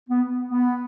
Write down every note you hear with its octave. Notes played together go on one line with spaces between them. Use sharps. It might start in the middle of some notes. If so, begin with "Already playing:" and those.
B3
B3